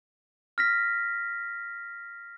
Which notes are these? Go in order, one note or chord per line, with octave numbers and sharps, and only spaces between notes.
F6 A#6 B6